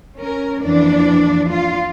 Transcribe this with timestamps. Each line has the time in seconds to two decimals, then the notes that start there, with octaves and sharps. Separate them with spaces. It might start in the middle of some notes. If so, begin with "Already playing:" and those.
0.17 C#4 A#4
0.62 F2 A#2 E3 D4 D5
1.51 F4